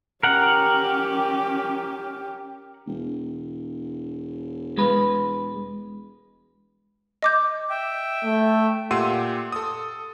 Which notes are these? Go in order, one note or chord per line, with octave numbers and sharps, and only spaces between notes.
C#4 G4 A#4 F#5
E1
G#3 B4
D#5 D6 G6
E5 G5
A3
A#2 G4 F#5 C6 E6 D#7
A4 D#6